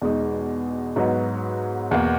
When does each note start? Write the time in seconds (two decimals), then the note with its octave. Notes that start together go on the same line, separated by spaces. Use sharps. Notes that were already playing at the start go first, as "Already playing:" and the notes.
0.02 E2 B2 G#3 D#4
0.96 G#2 F#3 B3 D#4
1.91 E2 B2 A#3